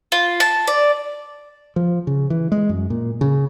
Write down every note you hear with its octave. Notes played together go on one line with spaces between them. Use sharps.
F4
A5
D5
F3
C#3
E3
G#3
F#2
A#2
C#3